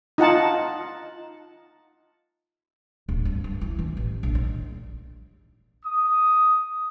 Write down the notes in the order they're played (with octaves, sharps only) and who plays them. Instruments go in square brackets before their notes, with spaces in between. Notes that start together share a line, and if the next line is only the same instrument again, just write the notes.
[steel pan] D#4 F4 F#5 A5
[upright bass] D1
G2
D2
E4
E3
A1
A#1
D#3
[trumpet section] D#6